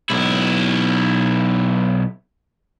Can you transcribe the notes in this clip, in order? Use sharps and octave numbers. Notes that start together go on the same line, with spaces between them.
B1 E4